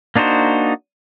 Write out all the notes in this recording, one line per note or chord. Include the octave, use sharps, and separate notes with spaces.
A#3 D4 D#4 F#4 C5